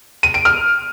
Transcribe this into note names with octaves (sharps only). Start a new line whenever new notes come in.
D#7
D7
F6